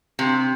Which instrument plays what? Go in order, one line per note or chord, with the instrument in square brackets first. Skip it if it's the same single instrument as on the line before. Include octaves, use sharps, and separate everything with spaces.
[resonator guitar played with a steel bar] C3